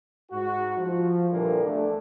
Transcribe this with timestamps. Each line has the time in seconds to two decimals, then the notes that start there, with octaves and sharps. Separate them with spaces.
0.31 G#2 F#4
0.79 F3
1.31 A#2 D3 E3 G3 A#3
1.63 E2 A3 D4